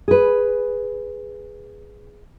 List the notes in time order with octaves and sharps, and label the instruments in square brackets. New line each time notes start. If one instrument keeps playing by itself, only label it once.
[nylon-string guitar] G#4 B4